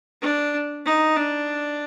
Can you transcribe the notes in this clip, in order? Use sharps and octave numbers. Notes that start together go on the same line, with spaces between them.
D4
D#4
D4